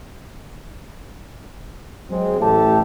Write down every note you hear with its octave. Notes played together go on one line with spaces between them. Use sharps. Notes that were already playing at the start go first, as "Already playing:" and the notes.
F#3 G#3 C4
A1 A2 G4 A4 E5 A5